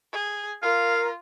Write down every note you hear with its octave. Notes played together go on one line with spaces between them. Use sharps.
G#4
F4 A#4 F5